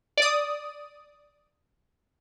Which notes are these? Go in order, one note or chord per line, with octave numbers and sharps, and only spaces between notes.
D5 D#6